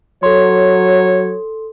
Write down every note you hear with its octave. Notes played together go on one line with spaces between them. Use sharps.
F#3 A4 C#5 C6